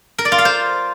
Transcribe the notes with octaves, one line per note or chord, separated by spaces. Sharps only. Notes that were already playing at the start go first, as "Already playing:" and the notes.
A#4
D5
F4
F5
C5